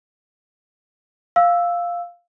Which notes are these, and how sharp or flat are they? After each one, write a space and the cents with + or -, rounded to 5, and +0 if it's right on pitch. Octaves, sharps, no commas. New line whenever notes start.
F5 +0 E6 +0